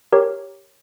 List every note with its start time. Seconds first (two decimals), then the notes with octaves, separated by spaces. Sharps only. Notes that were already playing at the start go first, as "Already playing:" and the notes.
0.12 G4 A#4 C#5